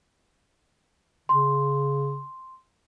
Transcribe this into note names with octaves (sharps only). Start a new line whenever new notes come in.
C#3 C6